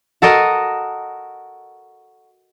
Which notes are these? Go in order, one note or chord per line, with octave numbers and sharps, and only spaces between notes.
F#4 A4 A#4 D#5